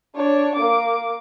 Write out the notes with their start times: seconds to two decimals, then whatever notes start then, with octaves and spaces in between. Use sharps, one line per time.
0.16 D4 C#5
0.56 A#3 D6